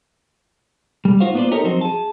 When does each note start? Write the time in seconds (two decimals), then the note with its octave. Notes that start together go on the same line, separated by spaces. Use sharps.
1.05 G3
1.20 D#4 F4 F#4 C5 F5
1.34 A#3 B3 F4 G#4 C5 D5
1.51 D#4 G4 A4 A#4 C#5 D#5
1.64 F3 F#3 C4 D#4 F#4 C5
1.81 G#4 A5